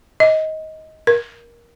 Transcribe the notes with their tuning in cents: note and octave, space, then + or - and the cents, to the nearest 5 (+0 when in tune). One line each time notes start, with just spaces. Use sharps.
D#5 +15
A#4 +20